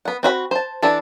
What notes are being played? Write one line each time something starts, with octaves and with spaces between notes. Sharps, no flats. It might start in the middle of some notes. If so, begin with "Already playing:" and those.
B3 F#5
C4 F#4 E5 B5
C5 A5
E3 D4 E4 A4